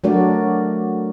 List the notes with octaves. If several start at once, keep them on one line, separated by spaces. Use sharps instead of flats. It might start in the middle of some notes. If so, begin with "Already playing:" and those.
F#3 A3 D4 F#4 A#4 D5